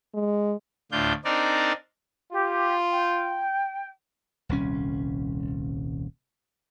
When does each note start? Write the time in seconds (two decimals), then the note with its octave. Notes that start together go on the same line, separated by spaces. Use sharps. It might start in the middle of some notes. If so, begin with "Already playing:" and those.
0.14 G#3
0.92 D2 A2 D4 F4 G6
1.25 C4 D4 D#4 A#4 D5
2.32 F4 G4
2.91 G5
4.49 D#1 C2 C#4